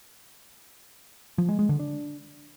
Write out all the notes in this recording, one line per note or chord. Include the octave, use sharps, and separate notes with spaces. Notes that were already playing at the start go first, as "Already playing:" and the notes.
F3
G#3
G#3
D3
D4